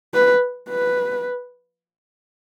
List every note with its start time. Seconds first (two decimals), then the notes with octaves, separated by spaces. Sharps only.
0.14 B4
0.69 B4